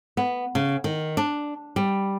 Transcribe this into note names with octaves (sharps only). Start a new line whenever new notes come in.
B3
C#3
D#3
D4
G3